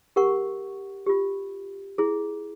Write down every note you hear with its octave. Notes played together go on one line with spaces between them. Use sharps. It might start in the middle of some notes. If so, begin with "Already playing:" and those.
G4 A#4 F#5 C#6
F4 G4
E4 G#4